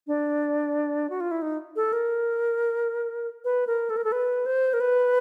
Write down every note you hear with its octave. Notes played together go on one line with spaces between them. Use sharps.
D4
F#4
F4
E4
D#4
A4
A#4
B4
A#4
A4
A#4
A4
B4
C5
A#4
B4